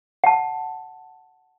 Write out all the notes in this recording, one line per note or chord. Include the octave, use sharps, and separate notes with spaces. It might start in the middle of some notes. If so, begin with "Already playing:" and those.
F#5 A5